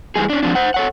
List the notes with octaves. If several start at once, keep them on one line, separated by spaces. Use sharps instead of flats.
G2 E3 G3 G#3 G#4
C#4 D4
F3 C4 D4
C5 F#5
A4 C#5 F#5